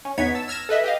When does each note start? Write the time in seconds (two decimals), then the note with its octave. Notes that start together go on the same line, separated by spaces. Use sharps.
0.05 C#4
0.18 E2 B3 D#4 C#5 G#6 B6
0.35 A5 E6
0.48 E6 F6 G#6 A#6 E7
0.69 A4 B4 D#5 E5
0.84 G4 D#5 F5